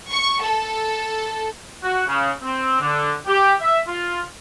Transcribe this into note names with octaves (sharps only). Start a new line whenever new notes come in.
C#6
A4
F#4
C#3
C4
D3
G4
E5
F4